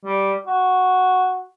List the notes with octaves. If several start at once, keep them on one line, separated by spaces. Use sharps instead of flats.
G3
F#4